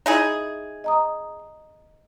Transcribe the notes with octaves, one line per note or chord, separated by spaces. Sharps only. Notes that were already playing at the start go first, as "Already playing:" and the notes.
D#4 E4 G#4
D#5 A#5 D#6